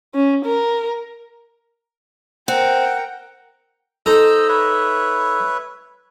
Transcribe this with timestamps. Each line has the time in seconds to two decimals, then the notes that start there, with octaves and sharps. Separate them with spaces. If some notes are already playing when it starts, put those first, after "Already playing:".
0.15 C#4
0.45 A#4
2.48 C4 A#4 F#5 G5
4.06 D#4 A4 C5 D#5 E6
4.49 B4 C#5 E5